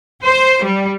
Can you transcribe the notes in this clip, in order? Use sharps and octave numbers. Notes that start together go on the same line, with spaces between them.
C5
G3